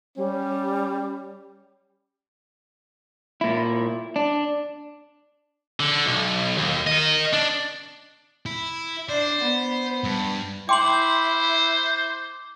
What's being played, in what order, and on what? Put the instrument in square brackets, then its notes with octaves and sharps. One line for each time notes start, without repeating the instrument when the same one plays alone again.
[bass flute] G3 [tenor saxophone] C#4
[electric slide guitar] A#2 E4
D4
[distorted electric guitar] D3
B1
D#2
A#4 D#5
D4
E4
[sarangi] D4 [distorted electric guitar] C5
[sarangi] B3
[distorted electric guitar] G2
[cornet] E4 [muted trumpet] C5 [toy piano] G5 G#5 C6 [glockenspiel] D6 F#7